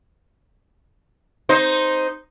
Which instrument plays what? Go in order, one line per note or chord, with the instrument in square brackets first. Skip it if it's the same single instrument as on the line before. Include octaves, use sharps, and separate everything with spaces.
[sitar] D#4 C5